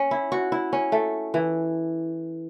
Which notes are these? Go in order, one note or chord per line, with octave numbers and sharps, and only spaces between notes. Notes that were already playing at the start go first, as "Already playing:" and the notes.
Already playing: C#4
E4
F#4
E4
C#4
A3
E3